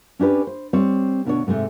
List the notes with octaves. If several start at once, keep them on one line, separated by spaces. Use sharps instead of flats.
C#4 D4 G4 B4
C5
G3 C4 C#5
D2 B2 D4 C#5
G#2 C3 G#3 A3